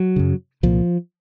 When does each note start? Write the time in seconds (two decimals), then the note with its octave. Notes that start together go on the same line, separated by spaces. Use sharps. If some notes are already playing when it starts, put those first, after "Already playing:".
Already playing: F#3
0.16 F#2 C#3
0.63 C2 A#2 F3